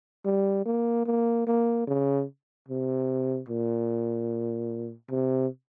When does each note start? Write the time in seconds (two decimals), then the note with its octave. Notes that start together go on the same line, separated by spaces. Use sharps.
0.25 G3
0.66 A#3
1.06 A#3
1.47 A#3
1.87 C#3
2.68 C3
3.49 A#2
5.11 C3